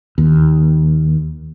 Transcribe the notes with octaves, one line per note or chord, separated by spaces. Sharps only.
D#2